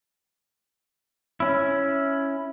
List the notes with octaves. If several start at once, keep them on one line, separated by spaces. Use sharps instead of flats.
C#4 E4